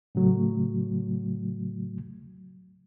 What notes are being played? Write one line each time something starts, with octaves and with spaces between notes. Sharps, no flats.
A2 C#3 F#3 A3